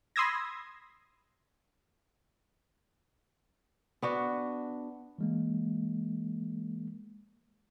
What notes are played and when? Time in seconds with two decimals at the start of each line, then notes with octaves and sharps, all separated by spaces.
0.16 B5 C6 D#6 E6 G#6 A#6
4.02 B3 D4 F#4
5.18 E3 G#3 A#3